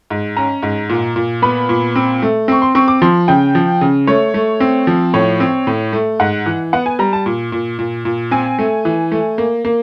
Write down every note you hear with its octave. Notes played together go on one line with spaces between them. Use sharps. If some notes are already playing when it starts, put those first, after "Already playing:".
G#2
C#4 A#5
G#2
A#2
A#2
B3 B5
A#2
C4
A3
C4 C#6
C6
C4 C#6
D6
F3 C6
C#3 G5
F3
C#3
A3 C#5
A3
C4
F3
A2 C#5
C4
A2
A3
G#2 F#5
E3
B3 F#5
G#5
G3 A#5
A5
A#2
A#2
A#2
A#2
C4 G#5
A3
E3
A3
A#3
A#3